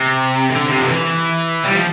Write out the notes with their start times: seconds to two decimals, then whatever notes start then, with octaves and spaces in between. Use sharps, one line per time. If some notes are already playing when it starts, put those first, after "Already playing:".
Already playing: C3
0.50 D3
0.68 C3
0.78 F3
0.87 E3
1.64 G3
1.75 F3